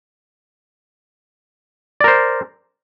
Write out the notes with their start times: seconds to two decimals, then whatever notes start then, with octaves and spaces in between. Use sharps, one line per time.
2.01 D5
2.04 A#4
2.08 C5